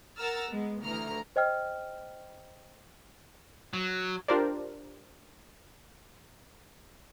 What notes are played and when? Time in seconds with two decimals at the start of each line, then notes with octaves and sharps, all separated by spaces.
0.17 A#4 F#5 A#5 E6 F6 A6
0.51 G#3 B3
0.84 D2 E3 A#5 F6
1.36 C5 D#5 G5 F6
3.74 F#3
4.28 D4 F4 G4 A#4 C5 D5